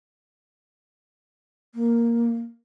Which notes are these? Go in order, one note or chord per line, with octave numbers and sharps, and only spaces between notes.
A#3